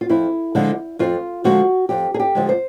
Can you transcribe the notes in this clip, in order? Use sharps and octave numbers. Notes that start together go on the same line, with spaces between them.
F4
F2 E4
D3 F3 G#3
F2 F4
D3 F3 G#3 F#4
F2 G4
G#4
G4
D3 F3 G#3
C5